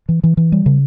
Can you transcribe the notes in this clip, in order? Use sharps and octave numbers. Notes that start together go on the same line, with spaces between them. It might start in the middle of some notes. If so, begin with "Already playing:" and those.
E3
E3
E3
G3
C#3